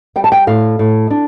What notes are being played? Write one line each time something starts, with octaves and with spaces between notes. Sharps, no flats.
G3 G5
A5
G5
A2 F5
A2
D4